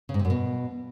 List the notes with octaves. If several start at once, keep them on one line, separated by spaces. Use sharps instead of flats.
C#3
G#2
C3
F#2
B2